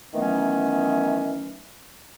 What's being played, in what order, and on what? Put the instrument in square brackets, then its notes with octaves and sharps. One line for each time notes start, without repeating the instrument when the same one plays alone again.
[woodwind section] D#3 E3 F#3 A3 B3 C#4